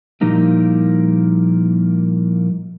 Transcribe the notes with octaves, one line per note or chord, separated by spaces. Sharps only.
A#2 F3 G3 A#3 D#4 E4